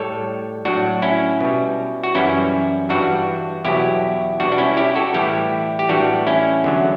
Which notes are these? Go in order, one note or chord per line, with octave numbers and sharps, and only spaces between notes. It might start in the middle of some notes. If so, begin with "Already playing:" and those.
Already playing: A2 G3 A4 C#5
A2 F#3 D4 F#4
C#4 E4
B2 G3
F#4
F#2 E3 G3 C#4 E4
G2 E3 G3 D4 F#4
E2 B2 F#3 E4 G4
B2 G3 D4 F#4
D4
C#4 E4
E4 G4
F#4 A4
A2 E3 G3 E4 G4
G4
A2 E3 G3 D4 F#4
C#4 E4
E2 D3 F#3